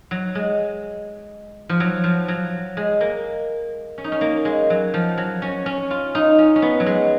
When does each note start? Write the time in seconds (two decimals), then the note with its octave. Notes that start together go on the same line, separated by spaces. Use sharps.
0.11 F#3
0.35 G#3
1.69 F3
1.80 F#3
2.04 F3
2.28 F#3
2.77 G#3
3.01 A#3
3.98 C#4
4.04 D#4
4.12 C#4
4.21 A#3
4.45 G#3
4.70 F#3
4.94 F3
5.18 F#3
5.42 C#4
5.66 C#4
5.91 F4
6.15 D#4
6.39 C#4
6.56 C#4
6.62 B3
6.80 F#3
6.86 G#3